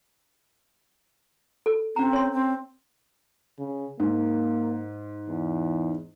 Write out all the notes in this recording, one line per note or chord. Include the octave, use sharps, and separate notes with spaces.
A4
C4 C#4 A#5
C#5 C6
C4
C#3
G#2 A#3
E2